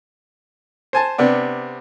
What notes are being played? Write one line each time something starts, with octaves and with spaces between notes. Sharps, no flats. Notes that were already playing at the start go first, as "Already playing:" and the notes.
C5 G#5 A5
C3 B3 D4